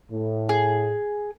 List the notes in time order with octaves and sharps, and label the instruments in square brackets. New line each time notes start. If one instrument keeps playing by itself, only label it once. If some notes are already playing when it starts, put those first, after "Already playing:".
[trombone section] A2
[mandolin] G#4